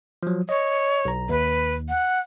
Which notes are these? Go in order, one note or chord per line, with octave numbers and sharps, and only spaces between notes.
F3 F#3
C#5 D#5
B1 A#5
D#2 B4
F#5